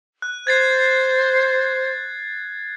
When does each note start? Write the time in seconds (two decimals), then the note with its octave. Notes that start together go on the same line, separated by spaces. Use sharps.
0.22 F#6
0.47 C5 G#6 A6 C7